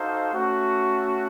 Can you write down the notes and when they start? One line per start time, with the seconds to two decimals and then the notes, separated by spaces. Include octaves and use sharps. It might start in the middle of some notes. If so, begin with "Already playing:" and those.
Already playing: D#4 F#4 A4 C5 F5
0.30 A3 C#4 F#4